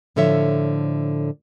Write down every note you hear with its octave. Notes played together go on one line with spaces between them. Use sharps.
A2 D3 F3 A4 C#5 E5